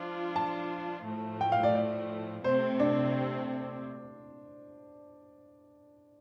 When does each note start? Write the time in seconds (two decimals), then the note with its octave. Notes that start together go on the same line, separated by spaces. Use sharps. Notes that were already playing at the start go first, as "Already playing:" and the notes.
Already playing: F3 D4 F4
0.36 A5
1.05 A2 F3 A3
1.41 G5
1.52 F5
1.63 D5
1.75 D5
2.44 C3 A3 C4 C5
2.80 D4